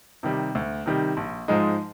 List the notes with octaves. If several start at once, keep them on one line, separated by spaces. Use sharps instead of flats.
C3 D#3 G3
D2
C3 D#3 G3
A#1
G#2 F3 G#3 D#4